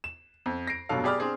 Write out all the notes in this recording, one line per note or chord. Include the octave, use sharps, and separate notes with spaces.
E7
F2
A#6 C7 D7
F1 G2 B2 F#3 A4 F5
G4 G#4 D5 B5 D6 F6
C4 D4 G#4 C5